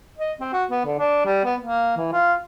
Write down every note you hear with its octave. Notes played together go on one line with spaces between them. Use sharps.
D#5
C4
F#4
B3
D3
D4
G3
B3
A#3
E3
F4